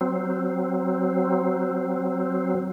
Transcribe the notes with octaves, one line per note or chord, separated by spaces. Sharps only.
F#3 C4